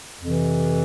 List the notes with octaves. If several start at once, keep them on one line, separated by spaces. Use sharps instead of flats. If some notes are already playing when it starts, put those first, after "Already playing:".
F2 C3 E3